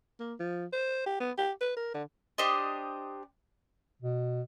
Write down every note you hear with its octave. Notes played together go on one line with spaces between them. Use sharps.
A#3
F3
C5
G4
B3
G4
B4
A#4
D3
D4 G4 C5 D#5
B2